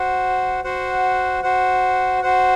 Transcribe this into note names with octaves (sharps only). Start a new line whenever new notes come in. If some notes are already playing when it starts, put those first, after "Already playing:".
Already playing: F#4 C5 F#5
F#4 C5 F#5
F#4 C5 F#5
F#4 C5 F#5